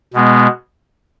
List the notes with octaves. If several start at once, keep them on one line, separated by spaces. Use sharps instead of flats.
B2 G#3 B3